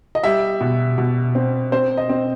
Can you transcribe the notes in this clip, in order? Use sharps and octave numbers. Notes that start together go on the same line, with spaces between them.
D#5
G3 E5
B2
B2
C4
C4 C5
D#5
C4